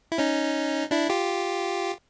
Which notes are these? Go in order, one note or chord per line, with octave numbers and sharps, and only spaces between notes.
E4
C#4 D#4
D4 E4
F4 G4